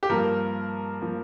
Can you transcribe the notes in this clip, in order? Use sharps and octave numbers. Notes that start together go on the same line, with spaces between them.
G4
G2 F3 A#3 A#4
F3 A#3